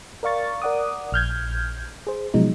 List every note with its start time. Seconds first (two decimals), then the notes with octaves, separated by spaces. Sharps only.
0.23 A#4 D5 F5 C#6 A6
0.62 A#4 D5 F#5 D6 D#6
1.12 A#1 F6 G6 G#6
2.07 G#4 C5
2.34 B2 F3 F#3 G#3 D#4